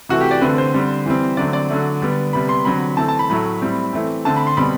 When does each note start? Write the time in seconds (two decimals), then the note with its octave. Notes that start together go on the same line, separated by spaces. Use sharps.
0.09 C3 E3 A3 F#4
0.21 G4
0.31 D5
0.41 D3 A3 C4 B4
0.58 C5
0.74 D3 G3 C4
1.06 E3 G3 C4
1.37 D3 F#3 A3 C4 D5
1.53 D5
1.70 D3 F#3 A3
2.02 D3 G3 B3
2.33 C3 G3 B3 B5
2.49 C6
2.65 D3 F#3 C4 B5
2.97 E3 A3 C4 A5
3.08 A5
3.19 B5
3.30 A2 F#3 A3 B5
3.62 A2 G3 C4
3.93 E3 A3 C4
4.25 D3 A3 C4 A5
4.36 B5
4.47 C6
4.57 B2 G3 C4 B5